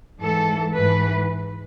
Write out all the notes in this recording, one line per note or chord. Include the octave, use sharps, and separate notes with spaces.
G#2 E3 A4
G#2 E3 B4